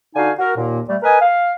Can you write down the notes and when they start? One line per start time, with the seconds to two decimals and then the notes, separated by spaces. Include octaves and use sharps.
0.16 D3 D#4 F#4 F5 G#5
0.39 F#4 A#4
0.57 D#2 A#2 A#3
0.89 G3 A3
1.02 A#4 B4 D#5 G#5
1.21 F5